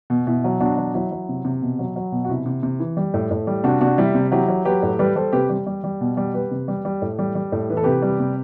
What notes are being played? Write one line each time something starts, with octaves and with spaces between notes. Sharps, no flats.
B2
B2 E4
F#3
B2 D4 F#4
F#3
F#3 E4
F#3
C3
C3
B2
F#3
F#3
B2
F#4
C3 E4
C3
C3
E3
G3
A2
A2
G3
C3 D4 F#4
C3 D4 F#4
G3 E4
C3
F#3 E4 G4
F#3
F#3 G4 B4
A2
G3 G4 B4
G3 A4 C5
C3 G4 B4
G3
G3
G3
B2
G3
G3 G4 B4
C3
G3
G3
A2
G3
G3
A2
E3 B4
A4
C3 G4 B4
G3
C3